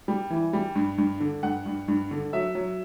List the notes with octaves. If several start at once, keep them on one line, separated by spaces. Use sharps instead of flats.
G3
E3
G3
G2
G2
D3
G2 F#5
G2
G2
D3
F#3 E5
F#3